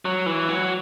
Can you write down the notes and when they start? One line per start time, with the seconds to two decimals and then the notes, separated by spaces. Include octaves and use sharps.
0.05 F#3
0.26 E3
0.49 F#3